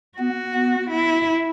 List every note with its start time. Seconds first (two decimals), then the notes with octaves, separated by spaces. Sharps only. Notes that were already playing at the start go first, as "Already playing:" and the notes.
0.18 B3 F#4
0.54 B3
0.90 E4